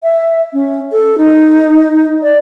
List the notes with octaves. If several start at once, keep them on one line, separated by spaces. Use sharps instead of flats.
E5
C#4
A4
D#4
D5